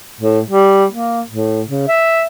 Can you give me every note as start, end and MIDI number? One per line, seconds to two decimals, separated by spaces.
0.20 0.40 45
0.50 0.85 55
0.92 1.21 58
1.29 1.62 45
1.68 1.88 49
1.88 2.24 76